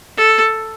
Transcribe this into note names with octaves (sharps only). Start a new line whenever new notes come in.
A4